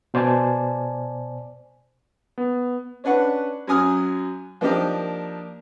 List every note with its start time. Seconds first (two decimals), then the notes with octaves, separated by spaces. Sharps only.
0.14 B2 C5 D5 G#5 A5
2.38 B3
3.04 C#4 D4 B4 F#5 C#6
3.67 F#2 F#3 G#5 D#6 F6
4.61 F3 A#3 D4 D#4 G4 A#4